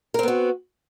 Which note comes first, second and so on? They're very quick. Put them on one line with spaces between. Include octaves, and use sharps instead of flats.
A#4 C4 B3 F#4